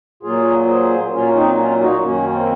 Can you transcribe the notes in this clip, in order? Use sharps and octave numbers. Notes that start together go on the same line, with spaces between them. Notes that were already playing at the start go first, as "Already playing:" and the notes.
A#2 F#3 A#3 F4 G#4
G#4 C5
A#2 F#3 A#3 C#4 F4
C4 D#4
C#4 F4
D#4 F#4
F#2 D#3 A#3 C#4
C4